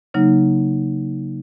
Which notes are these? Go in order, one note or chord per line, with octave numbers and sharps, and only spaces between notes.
C#3 F#3 A#3 D#4